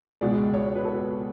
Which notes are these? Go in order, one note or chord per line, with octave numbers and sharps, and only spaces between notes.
C#2 B2 G#3 D5
C#5
B4
A4